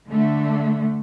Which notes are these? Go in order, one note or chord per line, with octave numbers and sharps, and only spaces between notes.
D3 A3